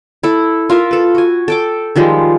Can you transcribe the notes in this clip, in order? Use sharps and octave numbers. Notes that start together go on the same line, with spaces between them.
E4 A4
F4 A#4 E5 F5
A4 B4
F#4 G#5
A4 G5 D6
D#3 F3 G3 G#3